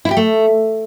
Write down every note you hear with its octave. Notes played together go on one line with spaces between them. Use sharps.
E4
G4
A3